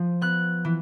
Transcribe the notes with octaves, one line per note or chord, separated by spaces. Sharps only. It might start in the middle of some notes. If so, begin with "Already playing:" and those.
Already playing: F3
B3 F#6
E3